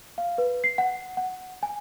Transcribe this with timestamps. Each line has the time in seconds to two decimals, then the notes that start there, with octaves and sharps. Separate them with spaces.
0.18 F5
0.38 B4
0.64 C7
0.78 F#5
1.17 F#5
1.63 G#5